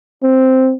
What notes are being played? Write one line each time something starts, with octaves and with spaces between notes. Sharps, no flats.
C4